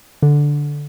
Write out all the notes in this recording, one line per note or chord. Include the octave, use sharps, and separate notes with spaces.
D3